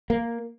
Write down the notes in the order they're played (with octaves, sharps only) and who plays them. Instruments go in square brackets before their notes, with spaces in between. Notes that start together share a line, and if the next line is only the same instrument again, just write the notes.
[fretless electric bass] A#3